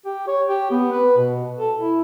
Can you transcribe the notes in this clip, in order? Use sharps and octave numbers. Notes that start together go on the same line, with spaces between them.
G4
C#5
G4
B3
B4
B2
A4
E4